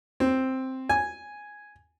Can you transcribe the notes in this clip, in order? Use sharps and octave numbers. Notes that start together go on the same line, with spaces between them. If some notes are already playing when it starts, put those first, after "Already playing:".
C4
G#5